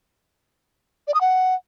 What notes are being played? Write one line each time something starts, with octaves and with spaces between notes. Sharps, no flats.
D5
D#6
F#5